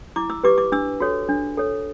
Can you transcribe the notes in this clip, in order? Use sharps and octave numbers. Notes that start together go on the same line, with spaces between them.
E4 D6
E6
G4 B4 D6
D6
D4 E6
F#4 A4 C#5
D4
A4 C#5